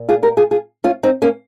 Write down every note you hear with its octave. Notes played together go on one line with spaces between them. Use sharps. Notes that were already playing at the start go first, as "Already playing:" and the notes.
Already playing: A#2
F4 G#4
G4 A#4
F4 G#4
F4 G#4
C#4 F4
C4 D#4
A#3 C#4